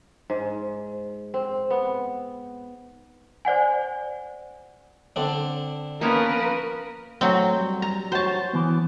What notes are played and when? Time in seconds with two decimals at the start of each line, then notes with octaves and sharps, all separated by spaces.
0.30 G#2
1.34 C4
1.70 B3
3.45 C5 D5 F#5 G#5
5.16 D3 C4 D4
6.01 F3 A#3 B3 C#4 A#4 B4
7.21 F#3 A3 C4 C#5
7.58 G3
7.82 A#5
8.12 F#4 C5 C#5 A5
8.53 E3 B3